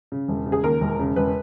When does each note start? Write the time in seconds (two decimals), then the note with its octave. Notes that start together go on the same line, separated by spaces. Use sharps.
0.12 C#3
0.28 E1
0.46 C#3
0.52 G#4
0.63 D#2 A#4
0.81 E1
0.99 C#3
1.16 E1 B4